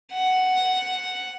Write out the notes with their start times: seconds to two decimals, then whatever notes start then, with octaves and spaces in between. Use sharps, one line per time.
0.13 F#5